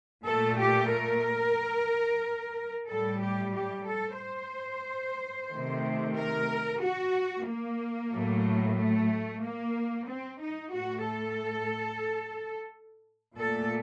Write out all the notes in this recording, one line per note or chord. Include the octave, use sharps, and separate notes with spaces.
A#2 A3 A4
G4
A#4
A2 G3 A4
G4
G4
A4
C5
C3 D#3 A3
A#4
F#4
A#3
A2 F#3 A3
A3
A#3
C4
D#4
A2 A3 F#4
A4
A#2 A3 A4